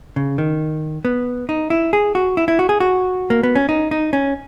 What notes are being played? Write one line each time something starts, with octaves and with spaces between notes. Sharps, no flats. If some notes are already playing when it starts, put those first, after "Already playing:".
C#3
D#3
B3
D#4
E4
G#4
F#4
E4
E4
F#4
G#4
F#4
A#3
B3
C#4
D#4
D#4
C#4